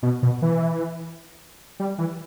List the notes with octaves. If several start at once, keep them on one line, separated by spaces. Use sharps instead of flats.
B2
B2
E3
G3
E3